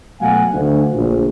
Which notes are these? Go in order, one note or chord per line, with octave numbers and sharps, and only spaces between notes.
B2 F#3 A3 F5 F#5 G#5
D2 D3
A#1